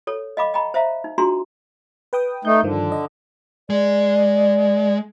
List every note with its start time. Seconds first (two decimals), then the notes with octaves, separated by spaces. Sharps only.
0.07 A4 C#5
0.37 D#5 F5 B5 D6
0.54 D#5 G5 A#5 B5 C#6
0.74 C5 E5 F5 A#5
1.04 D#4
1.18 D4 F4 F#4 G#4 A#5 C6
2.13 B4 G5 D#6
2.45 A3 D#4 G6
2.63 G2 D3 D#3 F3
2.92 D#5
3.70 G#3 D5